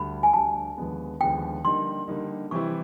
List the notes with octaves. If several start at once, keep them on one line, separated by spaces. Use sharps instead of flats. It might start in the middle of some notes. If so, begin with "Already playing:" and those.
Already playing: D2 D3 G3 B5
G#5
D2 D3 G3 A5
D#2 D3 F3 G#3 B3
D#2 D3 F3 G#3 B3 G5
D3 G3 A#3 D#4 C6
D3 G3 A#3 D#4
C3 E3 G3 C4 E4 C#6